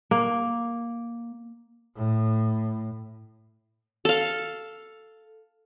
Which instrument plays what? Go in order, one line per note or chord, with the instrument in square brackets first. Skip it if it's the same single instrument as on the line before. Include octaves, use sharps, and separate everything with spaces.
[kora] A#3
[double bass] A2
[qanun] A4 F5